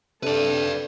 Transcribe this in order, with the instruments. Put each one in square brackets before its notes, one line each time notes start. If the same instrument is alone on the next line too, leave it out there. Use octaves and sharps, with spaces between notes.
[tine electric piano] C3 D4 [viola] A4 [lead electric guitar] B4 D5